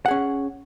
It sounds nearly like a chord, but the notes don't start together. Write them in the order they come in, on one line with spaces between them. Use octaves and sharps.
F#5 G#4 C#4